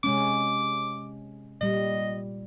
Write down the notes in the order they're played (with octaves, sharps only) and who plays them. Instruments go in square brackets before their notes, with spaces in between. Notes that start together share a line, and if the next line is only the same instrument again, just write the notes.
[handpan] C3 G#3 C#4 [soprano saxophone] D6
[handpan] A#2 G3 [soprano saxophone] D#5